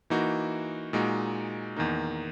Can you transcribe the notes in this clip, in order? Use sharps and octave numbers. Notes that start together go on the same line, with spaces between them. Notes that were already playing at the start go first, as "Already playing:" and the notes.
E3 A#3 D#4 F#4
A#2 G#3 D#4 F#4
E2 D#3 A#3 D#4